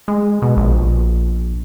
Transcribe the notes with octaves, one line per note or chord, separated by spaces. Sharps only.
G#3
B2
A#1